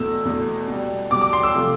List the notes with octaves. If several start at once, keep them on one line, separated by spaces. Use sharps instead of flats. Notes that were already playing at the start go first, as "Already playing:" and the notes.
Already playing: E2 B2 A3 E6
E2 B2 A3
B2 G3
B2 G3 D6
D6
C6
E6
C3 F3 A3